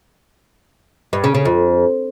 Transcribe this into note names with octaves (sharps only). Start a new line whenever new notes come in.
G2
C#3
C#3
F2